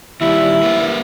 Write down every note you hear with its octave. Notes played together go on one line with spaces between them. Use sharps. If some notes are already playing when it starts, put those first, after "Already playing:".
D#2 G3 E4
A#3 B4